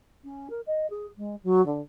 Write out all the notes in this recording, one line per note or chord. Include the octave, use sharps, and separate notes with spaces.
C#4
A#4
D#5
G#4
G#3
F#3
D3